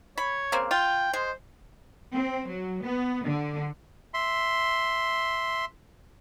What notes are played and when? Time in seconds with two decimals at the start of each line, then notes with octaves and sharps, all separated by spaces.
0.18 C#5 B5
0.52 C#3 A#3 C4
0.71 F4 G5
1.13 G#3 C5
2.13 C4
2.48 F#3
2.82 B3
3.25 D3
4.14 E5 C6